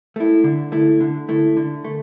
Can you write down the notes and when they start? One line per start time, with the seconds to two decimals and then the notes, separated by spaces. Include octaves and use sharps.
0.16 A3 E4
0.44 D3
0.72 A3 E4
1.01 D3
1.29 A3 E4
1.57 D3
1.85 A3